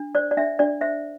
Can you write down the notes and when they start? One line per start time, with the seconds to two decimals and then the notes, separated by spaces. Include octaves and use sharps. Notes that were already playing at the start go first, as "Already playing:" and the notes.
Already playing: D4
0.15 C5 D5
0.31 D5
0.37 D4 E5
0.59 D4 D5
0.81 C5 E5